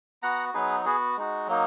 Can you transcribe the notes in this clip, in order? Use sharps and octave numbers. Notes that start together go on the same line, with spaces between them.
B3 F#4 F#5 A#5
F#3 B3 D#4 G#4 B4
B3 F#4 G#4
G#3 D#4 F#4
F#3 A#3 D#4